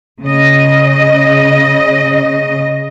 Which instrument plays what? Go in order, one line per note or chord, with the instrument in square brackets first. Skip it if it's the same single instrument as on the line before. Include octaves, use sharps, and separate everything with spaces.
[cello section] C#3 D#5